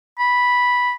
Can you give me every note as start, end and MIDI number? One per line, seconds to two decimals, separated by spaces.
0.19 0.93 83